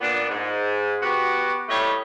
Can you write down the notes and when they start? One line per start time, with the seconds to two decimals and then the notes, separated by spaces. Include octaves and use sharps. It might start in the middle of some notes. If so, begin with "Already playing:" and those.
0.01 A#2 B3 D4
0.30 G#2
1.03 B3 F#4 G4
1.68 A2 G3 A3 G4 C#5 D#5